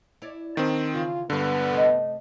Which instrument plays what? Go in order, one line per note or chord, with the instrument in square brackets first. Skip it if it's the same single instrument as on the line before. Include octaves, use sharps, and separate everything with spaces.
[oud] E4 C#5 D5
[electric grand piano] D#3 C4 [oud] D4
[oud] C#3 E3 F5 [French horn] F4
[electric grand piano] G2 D3 [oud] G#3 [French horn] B3
[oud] C3 A3 D#5